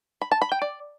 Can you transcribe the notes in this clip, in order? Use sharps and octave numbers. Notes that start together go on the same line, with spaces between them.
B5
A5
B5
G5
D5